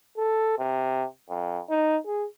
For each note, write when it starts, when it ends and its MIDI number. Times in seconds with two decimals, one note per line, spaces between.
0.17 0.57 69
0.58 1.05 48
1.29 1.60 41
1.69 1.97 63
2.06 2.26 68